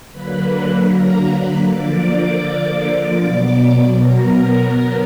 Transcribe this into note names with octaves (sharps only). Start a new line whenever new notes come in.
D3 F#3 A#3 B4 B5
A#4 A#5
B4 B5
D3 F3 A#3 D5 D6
B2 F#3 B3
A#4 A#5
D3 F#3 B3